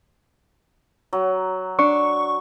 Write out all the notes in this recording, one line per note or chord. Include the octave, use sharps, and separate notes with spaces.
F#3
D4 C#6